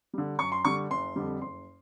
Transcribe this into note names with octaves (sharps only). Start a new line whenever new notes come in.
D3 G3
F#2 C#6
C6
D3 G3 C#6
F#1 C6
F2 D3 G3
F#1 C6